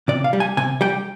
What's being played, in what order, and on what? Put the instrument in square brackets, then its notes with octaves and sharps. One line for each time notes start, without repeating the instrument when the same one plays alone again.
[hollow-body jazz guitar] C3 D5
F5
G3
G#5
C3 G#5
G3 G5